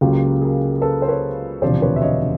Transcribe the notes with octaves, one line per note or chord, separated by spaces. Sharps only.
C#2 C#3 F#3 A#3 F4 G4
G#4 A#4
A4 B4
C5
B4 C#5
E1 D2 C3 F3 C5 D5
B4 C#5
E5
C#5 D#5